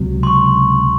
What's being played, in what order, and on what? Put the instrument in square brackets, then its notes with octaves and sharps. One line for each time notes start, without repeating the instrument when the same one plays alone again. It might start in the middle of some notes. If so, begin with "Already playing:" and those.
Already playing: [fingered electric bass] C#2 C3 F#3
[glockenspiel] C6
C#6